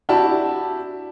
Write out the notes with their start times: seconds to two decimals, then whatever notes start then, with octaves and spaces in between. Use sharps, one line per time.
0.09 D4 E4 F#4 G4 A5